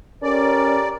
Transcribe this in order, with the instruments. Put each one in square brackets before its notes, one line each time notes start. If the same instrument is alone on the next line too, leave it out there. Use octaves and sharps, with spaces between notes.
[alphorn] C#4 [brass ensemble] G4 A4 A#4 [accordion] D5